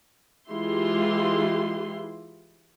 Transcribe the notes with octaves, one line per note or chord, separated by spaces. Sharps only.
E3 G#3 E4 F4 G4 C6